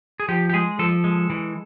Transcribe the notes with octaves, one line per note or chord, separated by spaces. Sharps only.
G#4
F3 G4
G4
G#3 G#4
F3 A4
G#3
E3